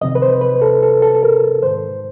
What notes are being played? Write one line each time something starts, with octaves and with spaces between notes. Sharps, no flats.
F2 C3 D#3 D#5
B4
C5
B4
A4
A4
A4
A4
A#4
G#2 D#3 C5